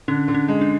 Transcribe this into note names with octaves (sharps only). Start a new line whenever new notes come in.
D3 C#4
D3
C#4
G#3
D4